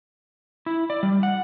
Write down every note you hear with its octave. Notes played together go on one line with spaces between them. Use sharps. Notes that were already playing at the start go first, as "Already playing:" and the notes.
E4
D5
G3
F#5